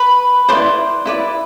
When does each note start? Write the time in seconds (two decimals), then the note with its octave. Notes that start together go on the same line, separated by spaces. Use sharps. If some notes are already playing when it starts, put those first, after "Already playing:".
Already playing: B4 B5
0.49 E4 B4 C5 D5 C6
1.06 E4 B4 D5